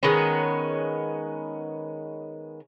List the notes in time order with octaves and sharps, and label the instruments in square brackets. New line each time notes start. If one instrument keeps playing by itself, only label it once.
[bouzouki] D#3 G#3 B3 C#4